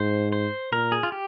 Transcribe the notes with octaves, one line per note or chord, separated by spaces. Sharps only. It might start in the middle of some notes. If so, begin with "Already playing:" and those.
Already playing: G#2 C5
C5
A#2 A#4
G#4
F4
G4